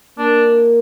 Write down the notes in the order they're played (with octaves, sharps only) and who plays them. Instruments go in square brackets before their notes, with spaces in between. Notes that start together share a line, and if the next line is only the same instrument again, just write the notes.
[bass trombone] A#3 [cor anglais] D4